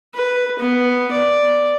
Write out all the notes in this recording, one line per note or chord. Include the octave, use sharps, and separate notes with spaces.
B4
B3
D5